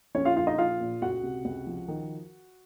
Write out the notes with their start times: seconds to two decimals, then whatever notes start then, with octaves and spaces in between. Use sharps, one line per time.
0.15 A#1 C#4 C#5
0.25 F4 F5
0.36 A#1 F4 F5
0.47 D#4 D#5
0.58 A#1 F4 F5
0.80 A#2
1.02 C#2 F#4 F#5
1.23 C3
1.45 C#2
1.67 F3
1.88 D#3